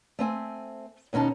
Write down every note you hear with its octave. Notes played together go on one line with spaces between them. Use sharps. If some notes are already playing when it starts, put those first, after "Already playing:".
A3 C4 G#5
D#2 B2 C#4 D#4 A5